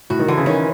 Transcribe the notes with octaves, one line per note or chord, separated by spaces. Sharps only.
A2 F#4
D#3
D3 E3
C#3
D#3 C#4